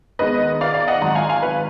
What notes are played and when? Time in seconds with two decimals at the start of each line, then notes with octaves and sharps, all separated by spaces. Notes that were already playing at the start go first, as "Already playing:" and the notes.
0.19 D#2 D#3 G#3 B3 B4 D#5
0.61 D5 F5
0.74 D5 F5
0.88 D#5 F#5
1.01 G#1 G#2 F#3 F#5 A#5
1.15 F5 G#5
1.29 F5 G#5
1.43 B4